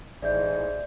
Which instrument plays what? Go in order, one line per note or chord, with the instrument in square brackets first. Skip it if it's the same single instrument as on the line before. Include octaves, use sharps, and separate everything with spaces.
[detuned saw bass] A1 [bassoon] G#2 [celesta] D5 E5 G6